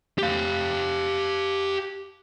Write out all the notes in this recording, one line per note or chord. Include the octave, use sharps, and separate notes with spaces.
G4 F5